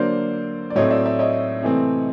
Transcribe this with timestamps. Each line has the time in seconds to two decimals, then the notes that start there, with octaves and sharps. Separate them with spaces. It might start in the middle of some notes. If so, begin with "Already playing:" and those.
Already playing: D3 F#3 A#3 C5 D5
0.70 D5
0.75 A2 F#3 A3 C4 C#5 D#5
0.90 D5 E5
1.06 D5 E5
1.19 C#5 D#5
1.62 C3 E3 A3 C4